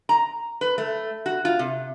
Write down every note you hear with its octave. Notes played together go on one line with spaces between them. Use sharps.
A#5
B4
A3
F#4
F4
C3